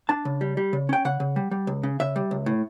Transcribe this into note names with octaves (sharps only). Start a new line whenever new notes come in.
D4 A5
C#3
G3
G3
C#3
C#4 G5
C#3 F#5
C#3
G3
G3
C#2
C#3
C#3 E5
G3
C#2
A2